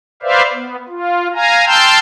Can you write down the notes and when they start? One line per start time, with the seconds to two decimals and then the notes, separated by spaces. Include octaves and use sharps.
0.23 B4 C5 D5 E5 F5
0.53 B3
0.89 F4
1.34 F5 G#5 A#5
1.66 G5 A5 C6 E6 F6 G6